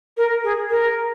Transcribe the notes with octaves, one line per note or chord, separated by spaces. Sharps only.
A#4
G#4
A#4